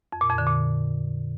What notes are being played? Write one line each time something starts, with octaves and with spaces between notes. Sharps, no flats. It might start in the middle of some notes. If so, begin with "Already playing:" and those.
F2
A#2
F2
D3
A#2